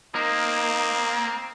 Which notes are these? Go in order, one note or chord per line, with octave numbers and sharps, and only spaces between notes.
A#3 C4 D#4